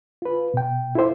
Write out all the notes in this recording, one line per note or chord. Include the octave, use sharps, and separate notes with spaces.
F4 B4
B2 G5
E4 F4 A4 C5 E5